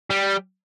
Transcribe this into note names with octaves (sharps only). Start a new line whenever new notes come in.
G3